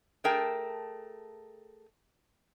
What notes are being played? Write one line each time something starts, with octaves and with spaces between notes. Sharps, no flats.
A3 G#4 A#4 G5 A5